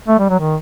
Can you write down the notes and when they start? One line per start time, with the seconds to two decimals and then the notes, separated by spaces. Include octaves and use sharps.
0.08 A3
0.19 G3
0.30 F#3
0.40 D#3